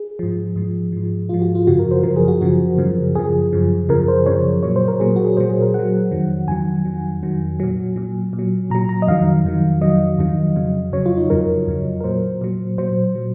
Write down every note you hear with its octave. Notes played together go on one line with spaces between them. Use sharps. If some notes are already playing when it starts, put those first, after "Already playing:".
Already playing: G#4
G#2 F3
G#2 F3
G#2 F3
G#2 F3 F4
F#4
F4
F#2 C#3 F3 F#4
A#4
C5
F#2 C#3 F3 A#4
G#4
F#4
F#2 C#3 F3 F#4
F#2 C#3 F3
F#2 C#3 F3 G#4
F#2 C#3 F3
F#2 C#3 F3 A#4
C5
F#2 C#3 F3 C#5
A#2 F#3 C#5
C5
A#4
A#2 F#3 G#4
F#4
G#4
A#2 F#3 C5
G#4
A#4
A#2 F#3 F#5
F2 D#3 F#3
F2 D#3 F#3 G#5
F2 D#3 F#3
F2 D#3 F#3
A#2 F#3
A#2 F#3
A#2
F#3
A#2 F#3 A#5
A#5
D#5
F2 D#3 F#3 F5
F2 D#3 F#3
F2 D#3 F#3 D#5
F2 D#3 F#3
F2 C#3 F#3
F2 C#3 F#3 C#5
F4
D#4
F2 C#3 F#3 A#4
F2 C#3 F#3
A#4
A#2 F#3 C5
A#2 F#3
A#2 F#3 C5
A#2 F#3